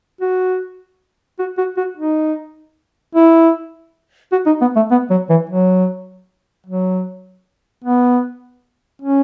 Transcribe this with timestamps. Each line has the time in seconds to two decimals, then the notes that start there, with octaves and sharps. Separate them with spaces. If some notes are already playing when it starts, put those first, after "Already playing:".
0.21 F#4
1.39 F#4
1.58 F#4
1.77 F#4
1.98 D#4
3.15 E4
4.32 F#4
4.46 D#4
4.61 B3
4.76 A3
4.91 B3
5.10 F#3
5.29 E3
5.50 F#3
6.66 F#3
7.84 B3
9.02 C#4